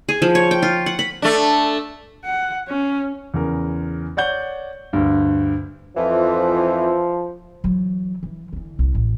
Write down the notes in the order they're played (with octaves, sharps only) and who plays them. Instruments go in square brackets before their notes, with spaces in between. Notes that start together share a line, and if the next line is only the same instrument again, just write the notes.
[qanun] G#4
F3
C#5
G5
F4
F#5
B5
[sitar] A3 D4
[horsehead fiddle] F#5
C#4
[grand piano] E2 C#3 A#4
C#5 D5 F#5 G6 G7
D2 G2
[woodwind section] F2 E3 [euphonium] F3
[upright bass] E3 F#3
E3
D3 E3
C2
A1